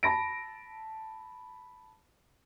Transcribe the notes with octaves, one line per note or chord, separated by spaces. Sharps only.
A5 B5 A#6 D7